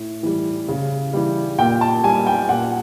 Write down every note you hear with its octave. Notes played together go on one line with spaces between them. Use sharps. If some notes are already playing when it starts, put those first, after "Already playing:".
Already playing: A2
E3 G3
C#3
E3 G3
A#2 G5
A5
G3 G#5
G5
A#2 F#5